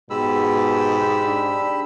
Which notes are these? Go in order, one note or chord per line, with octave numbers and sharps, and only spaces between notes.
G#2 B2 G4 B5 E6
D4